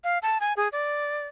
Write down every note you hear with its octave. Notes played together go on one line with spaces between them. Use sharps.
F5
A5
G#5
G#4
D5